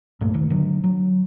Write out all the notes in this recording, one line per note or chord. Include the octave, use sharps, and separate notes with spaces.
C#2 G2 A#2 A3
D#1 D#3
D3 F#3
F#3